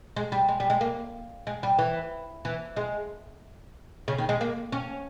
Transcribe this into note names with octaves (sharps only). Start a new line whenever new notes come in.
G#3
G3
G#3
G3
G#3
A#3
G#3
G3
E3
E3
G#3
C#3
D#3
G#3
A#3
C#4